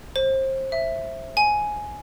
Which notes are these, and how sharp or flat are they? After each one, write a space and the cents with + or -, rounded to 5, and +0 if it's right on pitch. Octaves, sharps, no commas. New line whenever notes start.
C5 +30
E5 +5
G#5 +10